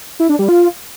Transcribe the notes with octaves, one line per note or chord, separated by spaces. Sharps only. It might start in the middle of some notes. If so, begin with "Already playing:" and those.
E4
D4
G3
F4